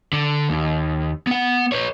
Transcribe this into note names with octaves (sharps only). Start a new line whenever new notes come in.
D3
D#2
B3 F#5
B4 C#5